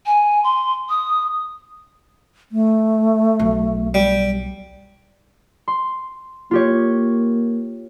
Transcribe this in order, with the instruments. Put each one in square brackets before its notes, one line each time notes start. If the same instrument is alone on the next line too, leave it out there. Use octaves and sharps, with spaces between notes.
[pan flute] G#5
C6
D#6
[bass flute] A3
[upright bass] B1
[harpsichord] G3
[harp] C6
[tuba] A#3 [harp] F4 G4 C#5